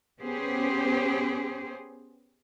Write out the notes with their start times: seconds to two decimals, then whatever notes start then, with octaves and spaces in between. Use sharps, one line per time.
0.21 B3 C#4 G4 G#4 C5